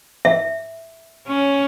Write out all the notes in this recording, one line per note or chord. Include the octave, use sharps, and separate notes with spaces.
E5
C#4